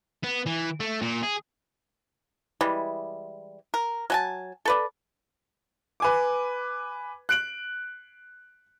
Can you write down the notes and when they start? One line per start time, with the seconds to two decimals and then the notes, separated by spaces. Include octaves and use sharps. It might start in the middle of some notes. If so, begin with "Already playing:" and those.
0.23 B3
0.46 E3
0.80 A3
1.02 A#2
1.23 G#4
2.61 E3 G3 G#3
3.74 A#4
4.10 F#3 G#5 A5
4.65 A4 B4 D5
6.00 B4 G#5 D6
7.29 F#6 D7 F#7